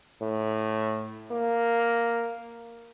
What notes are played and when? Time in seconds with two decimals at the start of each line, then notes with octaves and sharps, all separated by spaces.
0.22 A2
1.32 A#3